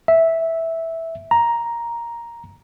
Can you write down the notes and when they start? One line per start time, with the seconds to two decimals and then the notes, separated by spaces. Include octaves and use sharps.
0.08 E5
1.31 A#5